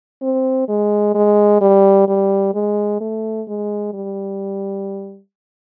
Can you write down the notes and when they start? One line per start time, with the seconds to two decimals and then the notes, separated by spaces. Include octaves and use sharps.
0.22 C4
0.68 G#3
1.15 G#3
1.61 G3
2.08 G3
2.55 G#3
3.01 A3
3.48 G#3
3.94 G3